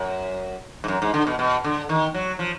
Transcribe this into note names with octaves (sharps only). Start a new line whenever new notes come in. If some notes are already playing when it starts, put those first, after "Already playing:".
Already playing: F#2
G#2
F#2
G#2
D3
B2
B2
D3
D#3
F#3
F3